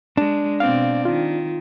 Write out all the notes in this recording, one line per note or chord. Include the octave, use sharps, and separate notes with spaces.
G#3 D4
B2 C4 D5 F5
D#3 F4